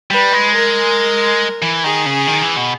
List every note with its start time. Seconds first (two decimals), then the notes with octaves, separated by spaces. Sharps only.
0.11 G3 B4
0.33 G#3
0.54 A#4
1.62 E3
1.84 D#3 G#4
2.06 C#3
2.27 D#3
2.42 E3
2.56 B2